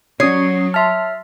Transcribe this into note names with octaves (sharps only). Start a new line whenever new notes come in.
F#3 C#4 C#5 D#6 C7
E5 A5 C6 F6